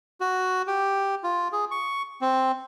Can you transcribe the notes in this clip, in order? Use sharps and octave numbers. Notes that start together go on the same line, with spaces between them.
F#4
G4
F4
G#4
C#6
C4